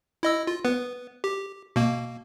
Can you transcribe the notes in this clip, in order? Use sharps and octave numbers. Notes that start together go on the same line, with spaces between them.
E4 D#5 E6
F4
B3 B4
G4
B2 A#3